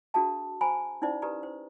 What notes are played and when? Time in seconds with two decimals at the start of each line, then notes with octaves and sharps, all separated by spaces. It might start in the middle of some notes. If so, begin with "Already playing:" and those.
0.14 D4 F#4 G#4 A4 F5 A5
0.61 C5 G#5 A#5 B5
1.02 C#4 D#4 E4 C5 D5
1.22 G4 A4 B4 D5 A#5
1.43 C5